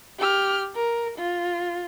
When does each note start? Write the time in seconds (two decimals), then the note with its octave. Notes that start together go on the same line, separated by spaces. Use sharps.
0.19 G4 F6
0.75 A#4
1.18 F4